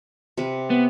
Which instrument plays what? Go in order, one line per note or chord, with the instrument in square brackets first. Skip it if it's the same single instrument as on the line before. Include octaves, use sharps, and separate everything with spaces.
[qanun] C3 B4
[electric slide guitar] B3